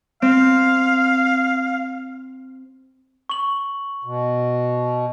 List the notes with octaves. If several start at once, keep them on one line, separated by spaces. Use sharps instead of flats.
C4 F5
C#6 F#7
B2